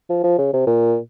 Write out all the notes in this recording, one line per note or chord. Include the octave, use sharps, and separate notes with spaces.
F3
F3
C#3
C3
A#2